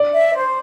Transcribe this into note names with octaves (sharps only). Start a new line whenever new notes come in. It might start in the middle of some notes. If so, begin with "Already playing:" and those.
Already playing: D5
E5
C5